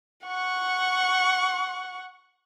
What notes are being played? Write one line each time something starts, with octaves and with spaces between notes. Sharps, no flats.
F#5 C#6